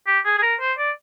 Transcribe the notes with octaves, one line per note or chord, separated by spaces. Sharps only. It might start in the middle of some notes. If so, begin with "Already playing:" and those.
G4
G#4
G#4
A#4
C5
D5